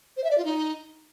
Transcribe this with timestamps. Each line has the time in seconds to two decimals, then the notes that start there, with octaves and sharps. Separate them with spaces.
0.17 C5
0.24 E5
0.31 D5
0.38 F4
0.45 D#4